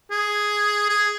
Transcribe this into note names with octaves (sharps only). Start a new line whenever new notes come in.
G#4
G#4